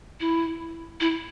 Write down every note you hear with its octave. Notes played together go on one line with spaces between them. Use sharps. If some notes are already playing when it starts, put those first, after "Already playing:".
E4
E4